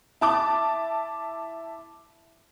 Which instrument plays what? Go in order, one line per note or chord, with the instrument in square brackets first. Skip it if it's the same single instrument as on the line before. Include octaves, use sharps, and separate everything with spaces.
[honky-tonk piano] E4 A5 D6